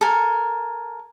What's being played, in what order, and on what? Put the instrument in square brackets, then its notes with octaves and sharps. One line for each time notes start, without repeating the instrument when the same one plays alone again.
[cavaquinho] A4 A#4 G#5